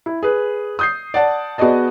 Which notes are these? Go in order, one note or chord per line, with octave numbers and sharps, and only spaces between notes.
E4
G#4 B4
D#6 G6 C7
D5 F#5 A5
B3 F#4 G#4 D5 D#5 A5